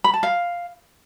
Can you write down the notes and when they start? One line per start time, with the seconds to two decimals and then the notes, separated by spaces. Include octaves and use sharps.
0.04 B5
0.14 A5
0.23 F5